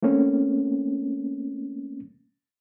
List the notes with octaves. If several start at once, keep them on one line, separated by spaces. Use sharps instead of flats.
A3 A#3 C4 C#4